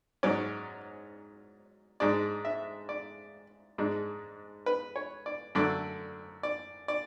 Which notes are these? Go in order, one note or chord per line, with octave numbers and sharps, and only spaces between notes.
G#2 F#3 C#4 D5
G#2 G#3 D4 D5
E5
D5
G#2 G#3 D4
B4
C#5
D5
F#2 D3 A3 D4 D5
D5
D5